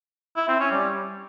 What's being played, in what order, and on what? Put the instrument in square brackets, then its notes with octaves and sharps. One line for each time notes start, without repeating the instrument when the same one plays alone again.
[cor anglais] E4
C4
C#4
G3